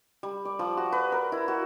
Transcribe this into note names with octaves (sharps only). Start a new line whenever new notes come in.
G3
D5
F3
F#4
B4
A#4
E4
F#4